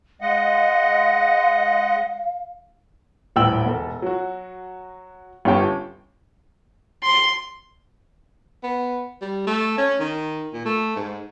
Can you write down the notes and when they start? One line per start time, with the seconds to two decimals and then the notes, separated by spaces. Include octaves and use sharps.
0.21 G#3 D#5 F5 F#5
3.36 D#1 A1 G5 E6 F#7
3.66 E1 A4
4.02 F#3 F#4
5.45 G1 C#4 F4 G4 G5 A5
7.03 C6
8.63 B3
9.21 G3
9.47 A3
9.78 C#4
10.00 D#3
10.53 A#2
10.65 A3
10.96 G#2